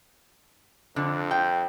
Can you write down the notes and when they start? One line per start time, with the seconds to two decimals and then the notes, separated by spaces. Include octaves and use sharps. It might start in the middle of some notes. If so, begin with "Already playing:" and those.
0.96 F2 D3
1.31 G5